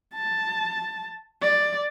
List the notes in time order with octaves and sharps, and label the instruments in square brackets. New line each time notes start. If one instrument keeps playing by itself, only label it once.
[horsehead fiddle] A5
D5